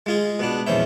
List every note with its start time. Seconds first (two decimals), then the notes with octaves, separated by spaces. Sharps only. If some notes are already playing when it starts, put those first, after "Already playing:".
0.06 G#3 F4 G#4
0.39 B2 B3 D4
0.67 A#1 E2 C#4 C5 E5